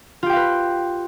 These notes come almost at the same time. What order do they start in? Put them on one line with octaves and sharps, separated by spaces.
F4 G4 G5 F5 B4